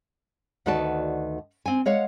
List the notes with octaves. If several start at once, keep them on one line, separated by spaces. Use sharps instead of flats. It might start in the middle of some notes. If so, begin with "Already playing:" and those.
D2 D#3 F#4 B4 D5 A5
C4 G#5
G#3 C#5 F5 F#5